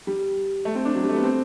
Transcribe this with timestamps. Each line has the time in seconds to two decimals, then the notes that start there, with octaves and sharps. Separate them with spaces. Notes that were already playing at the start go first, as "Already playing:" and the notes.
0.07 G3
0.65 A3
0.75 C4
0.85 D4
0.95 F#3
1.03 G3
1.09 A3
1.16 B3
1.24 C4